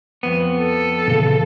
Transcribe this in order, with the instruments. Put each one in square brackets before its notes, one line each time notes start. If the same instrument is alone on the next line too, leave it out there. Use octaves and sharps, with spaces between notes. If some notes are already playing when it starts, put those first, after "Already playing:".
[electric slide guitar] F2 B3
[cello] A4
[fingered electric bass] A#2 C#3 E3